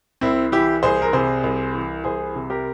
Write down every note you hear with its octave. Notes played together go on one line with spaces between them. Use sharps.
C2 C4 E4
E3 E4 G4
C2 G#4 C5
A#4
C3 G#4 C5
C2
E3
C2 G#4 C5
C3
G4 A#4